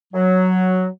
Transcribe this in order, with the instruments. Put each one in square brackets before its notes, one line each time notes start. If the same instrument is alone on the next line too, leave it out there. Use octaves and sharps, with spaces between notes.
[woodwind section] F#3